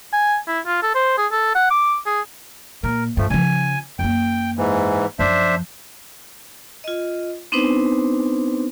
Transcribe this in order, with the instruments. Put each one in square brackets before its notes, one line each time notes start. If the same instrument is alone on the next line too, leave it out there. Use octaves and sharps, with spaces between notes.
[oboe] G#5
E4
F4
A4
C5
G#4
A4
F#5
D6
G#4
[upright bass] A#2 [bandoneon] A#4
[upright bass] G2 [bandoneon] F3 A3
[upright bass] C#3 F3 [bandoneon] G#5
[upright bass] F#2 A#3 [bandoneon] G5
[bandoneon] G#2 E3
[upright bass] F#2 F3 [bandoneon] D4 C5 E5
[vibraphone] F4 D#5
B3 C4 D4 D#4 B4 C5